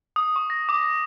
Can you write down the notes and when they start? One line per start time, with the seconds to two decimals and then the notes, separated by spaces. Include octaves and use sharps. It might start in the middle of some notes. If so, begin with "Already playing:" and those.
0.16 D#6
0.36 C#6
0.50 A#6
0.69 D6